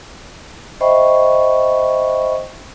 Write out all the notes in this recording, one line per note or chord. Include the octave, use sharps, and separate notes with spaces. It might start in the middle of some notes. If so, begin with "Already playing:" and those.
C5 D#5 E5 G5 B5 C#6